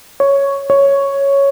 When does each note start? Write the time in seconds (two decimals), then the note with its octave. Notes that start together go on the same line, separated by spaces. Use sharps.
0.20 C#5
0.70 C#5